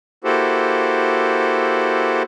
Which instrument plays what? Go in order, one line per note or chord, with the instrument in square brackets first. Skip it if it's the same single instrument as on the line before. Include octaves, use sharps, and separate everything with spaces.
[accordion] A#3 E4 F#4 G4 A4 C5